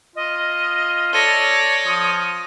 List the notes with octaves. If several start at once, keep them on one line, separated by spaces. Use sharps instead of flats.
F4 D#5
A4 C#5 D5 A#6 D#7 G7
F3 D#6